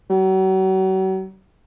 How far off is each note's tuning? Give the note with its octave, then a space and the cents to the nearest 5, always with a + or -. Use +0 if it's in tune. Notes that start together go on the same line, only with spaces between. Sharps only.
F#3 +40